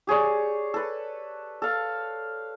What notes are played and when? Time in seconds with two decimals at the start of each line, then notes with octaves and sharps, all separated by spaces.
0.07 G4 G#4 C#5 D5
0.74 A4 B4
1.62 A4 F5